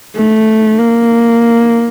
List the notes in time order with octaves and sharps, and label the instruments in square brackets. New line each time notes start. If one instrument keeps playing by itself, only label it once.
[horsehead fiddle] A3
A#3